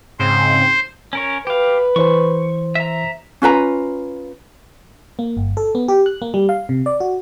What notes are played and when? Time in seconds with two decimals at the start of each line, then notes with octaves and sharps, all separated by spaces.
0.19 G#2 C#3 C4 C5
1.13 C#4 A#4 C#5
1.47 G4 B4 F5
1.96 E3 C5 C#6
2.75 E5 A#5
3.42 C#4 F4 B4 A#5
5.19 A#3
5.37 G1
5.57 A4
5.75 B3
5.88 G4
6.06 F#6
6.22 A#3
6.34 G3
6.49 F5
6.69 C3
6.86 D5
7.00 F#4